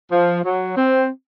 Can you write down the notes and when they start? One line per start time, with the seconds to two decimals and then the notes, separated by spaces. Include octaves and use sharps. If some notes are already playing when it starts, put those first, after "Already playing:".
0.10 F3
0.44 F#3
0.77 C4